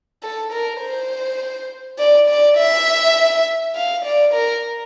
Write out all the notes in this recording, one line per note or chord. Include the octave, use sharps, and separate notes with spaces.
A4
A#4
C5
D5
D5
E5
F5
D5
A#4